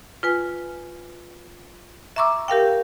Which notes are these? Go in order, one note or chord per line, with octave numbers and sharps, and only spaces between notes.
F4 B4 G#5
E5 A#5 C#6 D6 E6
G4 A#4 F5 G5